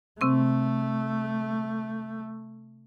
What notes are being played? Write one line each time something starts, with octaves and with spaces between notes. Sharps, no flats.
C3 A3 C4 C#6